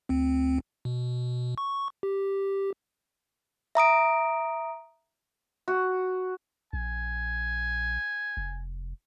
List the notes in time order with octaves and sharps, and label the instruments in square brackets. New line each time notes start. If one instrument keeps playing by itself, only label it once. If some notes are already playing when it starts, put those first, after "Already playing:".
[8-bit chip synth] D2 C4
B2
C#6
G4
[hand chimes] E5 A#5 D#6 D7
[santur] F#4
[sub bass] A#1 [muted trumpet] G#5
[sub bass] F1